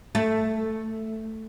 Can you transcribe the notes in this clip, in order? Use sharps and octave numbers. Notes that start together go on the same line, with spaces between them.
A3